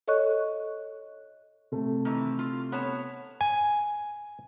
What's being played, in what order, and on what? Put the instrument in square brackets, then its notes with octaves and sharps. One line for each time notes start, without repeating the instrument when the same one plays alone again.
[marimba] A4 C#5 D#5 C#6 F#6
[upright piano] C3 A3
[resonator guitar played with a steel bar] D#3 E3
F4
B3 C#5 A5
[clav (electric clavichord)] G#5